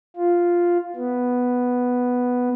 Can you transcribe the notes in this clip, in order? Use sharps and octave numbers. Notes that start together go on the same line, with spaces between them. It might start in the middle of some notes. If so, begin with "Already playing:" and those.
F4
B3